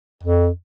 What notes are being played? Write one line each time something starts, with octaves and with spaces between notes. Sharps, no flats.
F2